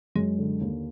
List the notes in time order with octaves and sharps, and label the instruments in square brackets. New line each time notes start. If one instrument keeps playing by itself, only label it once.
[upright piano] F#2 [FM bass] G#3
[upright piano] D3
D#2